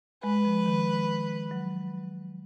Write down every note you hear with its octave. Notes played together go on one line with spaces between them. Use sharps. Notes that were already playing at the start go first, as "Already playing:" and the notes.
G#3 B4
F3
D#3
F#3